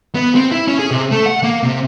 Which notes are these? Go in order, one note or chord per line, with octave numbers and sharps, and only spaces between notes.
B3
C4
E4
C#4
G#4
C3
A3
F#5
A#3
C3